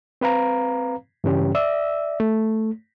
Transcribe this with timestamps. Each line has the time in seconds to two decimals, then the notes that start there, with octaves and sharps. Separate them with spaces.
0.21 C4 B4 F5 A#5
1.24 G2 C#3 E3 G3 C#4 G4
1.55 D5 E5 E6
2.20 A3